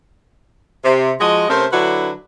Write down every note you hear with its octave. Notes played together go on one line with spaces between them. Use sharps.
C3
F3 G#3 F#4 D#5
C3 A3 C#4 A#4 C5
D3 F#3 D4 E4 F#4 B4